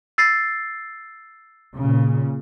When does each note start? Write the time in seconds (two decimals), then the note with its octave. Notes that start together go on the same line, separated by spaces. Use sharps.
0.18 E6 A6 C7
1.77 A#2 C#3